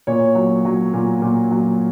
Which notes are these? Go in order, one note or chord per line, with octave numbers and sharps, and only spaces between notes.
A#2 C#5
F#3
F#3
A#2
A#2
F#3